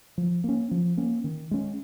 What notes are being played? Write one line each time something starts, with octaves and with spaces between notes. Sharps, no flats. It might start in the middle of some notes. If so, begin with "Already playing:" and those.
F3
A#3 C#4
F3
A#3 C#4
D#3
G#3 C#4